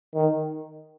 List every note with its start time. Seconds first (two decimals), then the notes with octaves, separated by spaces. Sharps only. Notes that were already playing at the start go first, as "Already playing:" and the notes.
0.15 D#3